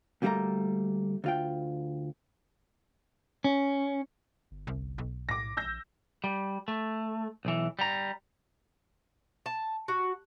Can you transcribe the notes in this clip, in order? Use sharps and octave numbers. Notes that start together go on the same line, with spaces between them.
D2 C3 G3 A3 A#3 A#5
D2 F4 G5
C#4
G1
C2
B1
A2 D6 A#6
A#1 E6 G6 A#6
G3
A3
B1 E3
G3 A#5
A5
F#4